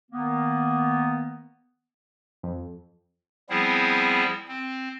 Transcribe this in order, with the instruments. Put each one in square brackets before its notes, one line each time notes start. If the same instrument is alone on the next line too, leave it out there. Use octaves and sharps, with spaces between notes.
[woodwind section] D#3 A#3 B3
[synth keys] F2
[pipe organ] F3 G3 B3 C4 E4 G#4
C4